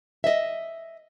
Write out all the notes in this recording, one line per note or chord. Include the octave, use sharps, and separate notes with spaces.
D#5 E5